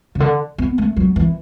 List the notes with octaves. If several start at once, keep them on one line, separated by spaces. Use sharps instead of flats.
C#3
D3
B3
A3
F#3
E3